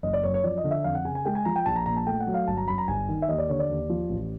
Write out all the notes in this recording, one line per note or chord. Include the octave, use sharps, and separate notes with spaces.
F#1 D#5
D5
F#2 C#5
C#5
F3 D5
D#5
D3
E5
F2 F5
F#5
C#3 G#5
G#5
G#3 G5
G#5
F3 A#5
G5
A#1 A5
A#5
A#2 A#5
A5
A3 G5
F#5
F#3
F5
G1 A5
A#5
F#2 B5
A#5
G1 G#5
D#3
E5
D#2 D#5
D5
D3 C#5
D5
D#2
F3
A1